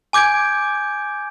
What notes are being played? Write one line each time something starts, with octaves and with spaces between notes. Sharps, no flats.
G#5 D6 G6 G#6 D7